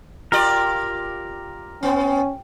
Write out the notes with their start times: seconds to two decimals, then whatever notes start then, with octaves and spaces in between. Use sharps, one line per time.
0.32 F4 G4 A#4 D5
1.83 B3 C#4